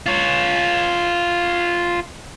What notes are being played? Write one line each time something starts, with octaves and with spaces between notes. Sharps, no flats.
F4 C#5